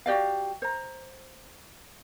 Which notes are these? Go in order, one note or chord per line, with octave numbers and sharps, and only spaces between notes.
F#4 G4 D5 F5
C5 A#5